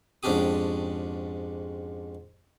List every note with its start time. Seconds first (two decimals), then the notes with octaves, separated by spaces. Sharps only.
0.23 F2 G#2 C#4 D4 G4 D#6